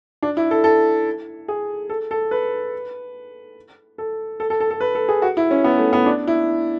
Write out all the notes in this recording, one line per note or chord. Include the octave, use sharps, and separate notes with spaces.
D4
E4
A4
A4
G#4
A4
A4
B4
A4
A4
A4
A4
A4
B4
A4
G#4
F#4
E4
C#4
B3
A3
B3
D4
E4